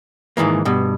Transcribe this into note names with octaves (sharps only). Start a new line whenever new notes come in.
G#2 D#3 E3 A#3
G2 B2